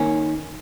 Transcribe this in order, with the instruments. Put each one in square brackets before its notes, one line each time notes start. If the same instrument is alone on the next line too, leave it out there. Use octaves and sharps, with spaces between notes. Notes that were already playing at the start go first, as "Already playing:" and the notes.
Already playing: [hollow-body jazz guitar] D#3 A#3 C#4